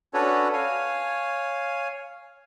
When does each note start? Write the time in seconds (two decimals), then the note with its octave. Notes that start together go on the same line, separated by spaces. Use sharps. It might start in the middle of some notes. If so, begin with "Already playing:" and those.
0.14 C#4 D4 F#4 A4 B4 C#5
0.53 C#5 F5 G#5